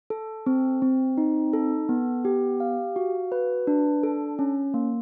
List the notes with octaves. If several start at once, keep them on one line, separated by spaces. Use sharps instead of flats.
A4
C4
C4
D#4
A4
B3
G4
F5
F#4
B4
D4
A4
C#4
A#3